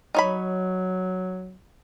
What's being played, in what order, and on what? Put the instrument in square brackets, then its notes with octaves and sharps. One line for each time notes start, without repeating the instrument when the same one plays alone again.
[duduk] F#3 [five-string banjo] D#4 C#5 B5